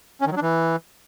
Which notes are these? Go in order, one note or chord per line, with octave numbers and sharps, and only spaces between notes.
C#4
D#3
F#3
D4
E3